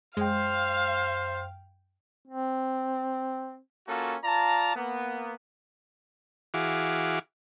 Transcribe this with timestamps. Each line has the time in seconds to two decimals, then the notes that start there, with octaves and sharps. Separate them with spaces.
0.17 F#2 G#3 C5 F5 G5
2.27 C4
3.88 A#3 C#4 F4 F#4 A4
4.24 F4 D5 A5 A#5
4.75 A#3 B3
6.54 E3 F#4 G#4 F5 D6